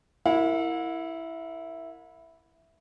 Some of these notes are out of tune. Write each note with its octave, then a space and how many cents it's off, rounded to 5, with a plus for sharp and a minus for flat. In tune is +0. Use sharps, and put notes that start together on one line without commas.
E4 +0 A#4 -15 F#5 -45